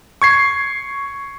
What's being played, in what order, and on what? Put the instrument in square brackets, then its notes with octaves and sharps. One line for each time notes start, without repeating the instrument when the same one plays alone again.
[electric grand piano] C#6 G#6 C7